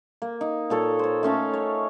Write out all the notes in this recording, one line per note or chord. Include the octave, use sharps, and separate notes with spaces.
A#3
D#4
A#2 A4 C#5
C5 C#5
A3 C#4 F5 A5
C#5